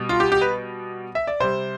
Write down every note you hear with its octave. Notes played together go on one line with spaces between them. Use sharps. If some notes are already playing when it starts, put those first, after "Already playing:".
Already playing: B2 G3
F4
G4
G4
B4
E5
D5
C3 G3 C5